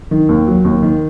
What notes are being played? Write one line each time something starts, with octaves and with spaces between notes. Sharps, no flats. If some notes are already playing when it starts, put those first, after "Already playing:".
D#3
D#2
F#3
D#2
D#3